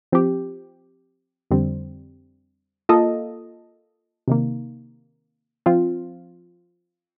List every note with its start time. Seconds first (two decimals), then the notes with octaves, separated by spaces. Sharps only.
0.12 F3 C4 G4
1.51 F2 D3 G3 C4
2.89 A#3 F4 A4 D#5
4.28 C3 D#3 A#3
5.66 F3 C4 F4